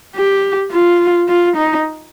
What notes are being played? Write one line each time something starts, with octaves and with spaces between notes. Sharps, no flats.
G4
F4
F4
D#4